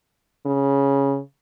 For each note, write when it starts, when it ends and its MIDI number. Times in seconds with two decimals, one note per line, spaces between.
0.46 1.19 49